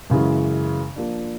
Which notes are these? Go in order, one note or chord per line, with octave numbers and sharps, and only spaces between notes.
F#2 C#3 E3 G#3
F3 A#3 D4